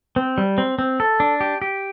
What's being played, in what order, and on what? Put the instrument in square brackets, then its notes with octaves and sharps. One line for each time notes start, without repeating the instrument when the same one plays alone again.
[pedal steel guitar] C4
G3
C4
C4
A4
D4
G4
G4